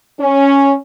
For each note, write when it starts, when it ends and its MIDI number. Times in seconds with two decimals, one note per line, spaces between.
0.20 0.75 61